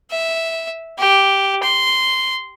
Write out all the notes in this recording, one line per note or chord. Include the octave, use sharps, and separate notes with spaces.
E5
G4
C6